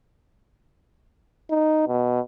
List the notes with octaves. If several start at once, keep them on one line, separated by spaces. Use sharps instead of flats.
D#4
B2